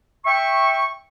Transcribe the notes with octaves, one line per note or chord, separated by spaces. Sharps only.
E5 G5 C#6